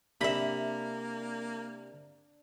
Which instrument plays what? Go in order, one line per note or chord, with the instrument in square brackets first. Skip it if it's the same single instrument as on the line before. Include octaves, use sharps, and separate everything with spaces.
[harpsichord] C3 [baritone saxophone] A#3 [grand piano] D4 [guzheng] E5 B5